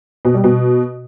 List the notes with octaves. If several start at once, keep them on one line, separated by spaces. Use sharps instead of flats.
B2
G3
B2